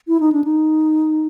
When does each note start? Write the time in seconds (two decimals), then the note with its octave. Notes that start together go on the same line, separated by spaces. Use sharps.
0.08 E4
0.20 D#4
0.32 D4
0.44 D#4